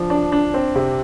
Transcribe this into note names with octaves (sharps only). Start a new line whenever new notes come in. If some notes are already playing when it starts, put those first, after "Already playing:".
Already playing: F3 D4
D4
D4
C4
C3